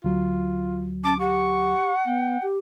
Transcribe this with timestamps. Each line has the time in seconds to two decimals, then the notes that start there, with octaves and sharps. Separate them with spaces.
0.04 D2 F#3 F4
1.04 C#4 A5 D6
1.19 G4 F#5 C#6
2.06 B3 G5
2.42 G4